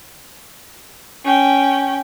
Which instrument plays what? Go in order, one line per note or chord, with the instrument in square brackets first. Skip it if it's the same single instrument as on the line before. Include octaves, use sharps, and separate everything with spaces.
[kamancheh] C#4 G5